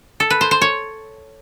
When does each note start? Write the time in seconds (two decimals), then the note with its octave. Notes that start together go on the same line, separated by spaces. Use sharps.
0.20 A4
0.30 B4
0.41 C5
0.51 C5
0.61 C#5